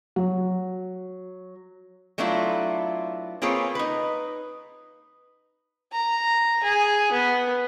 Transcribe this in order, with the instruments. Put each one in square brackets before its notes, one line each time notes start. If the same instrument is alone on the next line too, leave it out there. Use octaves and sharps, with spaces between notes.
[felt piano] F#3
[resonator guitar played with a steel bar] F#3 A3 B3 D4 E4 F4
A#3 C4 F4 G#4 B4 C#5
D#4 B4
[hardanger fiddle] A#5
G#4
B3